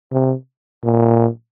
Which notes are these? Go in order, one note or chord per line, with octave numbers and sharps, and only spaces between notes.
C3
A#2